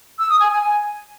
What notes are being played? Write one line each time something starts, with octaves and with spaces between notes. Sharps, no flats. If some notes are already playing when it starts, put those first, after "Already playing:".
E6
D#6
G#5
G#5
G#5